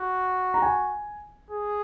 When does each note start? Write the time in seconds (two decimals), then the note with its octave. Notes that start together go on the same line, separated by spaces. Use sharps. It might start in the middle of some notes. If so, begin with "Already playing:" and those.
Already playing: F#4
0.54 A#5
0.62 G#5
1.50 G#4